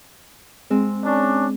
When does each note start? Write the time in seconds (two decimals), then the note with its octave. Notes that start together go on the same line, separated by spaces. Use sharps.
0.70 G#3 C4
1.03 C#4 D4